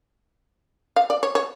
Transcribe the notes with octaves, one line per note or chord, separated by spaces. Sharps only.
F5
D5
C#5
C#5